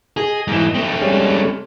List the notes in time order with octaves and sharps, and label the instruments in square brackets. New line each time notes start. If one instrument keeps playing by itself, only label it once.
[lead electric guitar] G#4 [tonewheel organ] D#5
[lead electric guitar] G#2 E3
A3 C4
[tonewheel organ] G3 G#3 C#4